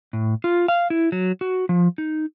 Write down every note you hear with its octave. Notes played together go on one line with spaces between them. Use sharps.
A2
F4
F5
E4
F#3
F#4
F3
D#4